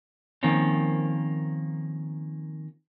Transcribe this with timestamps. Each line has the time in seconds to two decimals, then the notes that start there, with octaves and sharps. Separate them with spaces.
0.43 D#3 F3 A#3 C4 C#4